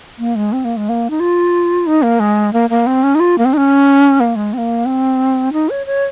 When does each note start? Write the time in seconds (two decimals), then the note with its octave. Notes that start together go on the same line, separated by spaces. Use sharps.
0.19 A#3
0.36 G#3
0.53 C4
0.65 A#3
0.77 G#3
0.89 A#3
1.10 D#4
1.20 F4
1.87 D#4
2.02 A#3
2.20 G#3
2.53 A#3
2.70 A#3
2.87 C4
3.03 C#4
3.15 D#4
3.20 F4
3.38 A#3
3.45 C4
3.53 D#4
3.57 C#4
4.20 A#3
4.36 G#3
4.53 C4
4.58 A#3
4.86 C4
5.53 D#4
5.70 C#5
5.86 C#5